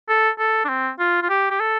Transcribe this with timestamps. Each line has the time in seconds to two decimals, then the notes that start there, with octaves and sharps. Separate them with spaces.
0.08 A4
0.39 A4
0.65 D4
0.69 C4
0.99 F4
1.22 F4
1.29 G4
1.50 G4
1.60 A4